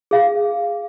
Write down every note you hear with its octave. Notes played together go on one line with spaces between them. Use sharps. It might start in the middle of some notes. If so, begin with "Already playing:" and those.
G#4 F5